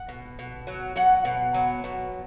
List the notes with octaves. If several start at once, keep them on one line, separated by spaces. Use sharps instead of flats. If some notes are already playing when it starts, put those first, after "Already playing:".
Already playing: F#5
B2
B2
F#3
F#3 F#5
B2
F#3
B2